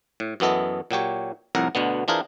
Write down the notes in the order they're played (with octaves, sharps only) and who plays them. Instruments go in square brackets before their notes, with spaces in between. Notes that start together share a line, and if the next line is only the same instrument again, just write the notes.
[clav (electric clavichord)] A2
F#2 E3 B3 A4 D#5
A#2 F#3 G4 C#5
C2 F2 A2 A#4 F#5 A#5
D2 B2 D3 B3
E3 D4 F4 G#4 A#4 C5